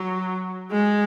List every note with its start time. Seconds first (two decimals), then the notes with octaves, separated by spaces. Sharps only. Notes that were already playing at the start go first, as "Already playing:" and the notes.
Already playing: F#3
0.71 G#3